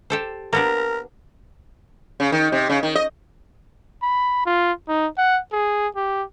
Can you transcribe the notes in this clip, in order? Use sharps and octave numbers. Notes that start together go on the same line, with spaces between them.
G4 A4 C5
A#3 B3 D4 A#4
C#3
D#3
C3
C#3
D#3
D#5
B5
F4
D#4
F#5
G#4
G4